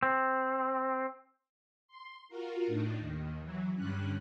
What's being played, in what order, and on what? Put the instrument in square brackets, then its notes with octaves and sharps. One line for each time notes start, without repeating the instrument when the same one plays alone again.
[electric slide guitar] C4
[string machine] C6
F4 F#4 A#4
A2 D4 D#4
D#2 D#3
E3 F#3
G2 D3 G3 C#4 F#6